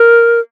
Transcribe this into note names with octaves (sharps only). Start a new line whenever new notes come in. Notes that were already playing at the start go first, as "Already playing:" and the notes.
Already playing: A#4